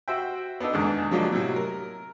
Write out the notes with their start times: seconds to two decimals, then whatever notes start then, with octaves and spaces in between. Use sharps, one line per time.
0.08 F#4 C5 E5 G5
0.60 B3 D4 D#4 A4
0.73 E2 G#2 B2 D3 D#3
1.11 F3 F#3 G#3 A#3 D4
1.32 A2 C3 F#3
1.56 A#4